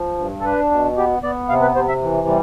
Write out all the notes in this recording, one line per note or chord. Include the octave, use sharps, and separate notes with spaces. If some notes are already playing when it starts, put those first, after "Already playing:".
Already playing: F3
G2
A4
D4 B4
B2
B3 G4
B3 D5
C3 F5
B4
C3 C5
E5
E3
G3